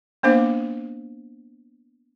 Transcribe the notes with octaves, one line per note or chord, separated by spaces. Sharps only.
A#3 B3 D4 C5 F5 D6